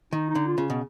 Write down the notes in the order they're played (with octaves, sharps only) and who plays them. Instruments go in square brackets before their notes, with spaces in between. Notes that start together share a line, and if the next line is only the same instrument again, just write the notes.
[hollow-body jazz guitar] D#3 [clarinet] D#4
[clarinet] D#4
[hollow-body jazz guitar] D3
[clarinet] F4
[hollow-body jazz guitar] C#3
B2